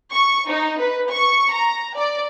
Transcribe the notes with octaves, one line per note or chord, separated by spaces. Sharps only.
C#6
D#4
B4
C#6
A#5
D5